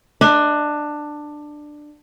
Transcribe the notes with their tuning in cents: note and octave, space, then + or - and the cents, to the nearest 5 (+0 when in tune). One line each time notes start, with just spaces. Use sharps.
D4 +15 D#5 +45